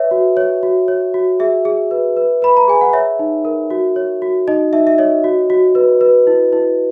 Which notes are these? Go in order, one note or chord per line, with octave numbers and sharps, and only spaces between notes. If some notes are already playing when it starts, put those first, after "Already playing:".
Already playing: B4 C#5 E5
F#4
C#5
F#4
C#5
F#4
G#4 E5
G#4
B4
B4
B4 B5
A#5
G#4 G#5
F#5
C#5 E5
D#4
A#4
F#4
C#5
F#4
D#4 D#5
D#4 E5
E5
C#5 D#5
F#4
F#4
B4
B4
E4
E4